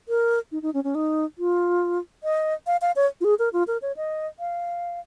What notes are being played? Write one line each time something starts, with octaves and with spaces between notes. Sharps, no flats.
A#4
D#4
D#4
C#4
C#4
D#4
F4
D#5
F5
F5
C#5
F4
G#4
A#4
F4
A#4
C#5
D#5
F5